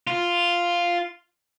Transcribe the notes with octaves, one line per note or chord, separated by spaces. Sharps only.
F4